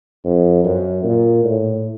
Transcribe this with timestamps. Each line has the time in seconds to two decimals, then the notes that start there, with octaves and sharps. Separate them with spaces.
0.25 F2
0.64 F#2
1.04 A#2
1.44 A2